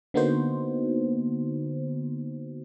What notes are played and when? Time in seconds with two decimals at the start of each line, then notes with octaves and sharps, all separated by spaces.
0.14 D3 A#3 B3 D#4 F#4 C5